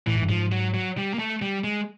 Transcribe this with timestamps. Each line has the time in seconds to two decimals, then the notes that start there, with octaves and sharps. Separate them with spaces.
0.07 A2 E3
0.15 G#2
0.22 G2
0.29 G#2 F3
0.52 F#3
0.74 F#3
0.98 G3
1.14 A#3
1.19 A3
1.42 G3
1.64 G#3